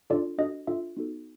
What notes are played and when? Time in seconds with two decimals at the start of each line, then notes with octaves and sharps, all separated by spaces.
0.10 D4 F4 A4 D5
0.38 D4 F#4 A4 D#5
0.67 D4 F4 A4 E5
0.97 B3 D#4 F#4 A4